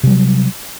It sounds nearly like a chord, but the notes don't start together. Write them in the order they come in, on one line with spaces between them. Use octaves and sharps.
C3 G3 F#3